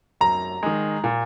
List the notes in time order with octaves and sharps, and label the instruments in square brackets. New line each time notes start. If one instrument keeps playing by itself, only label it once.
[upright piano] F#2 [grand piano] A#5
[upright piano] D#3 G#3
A#2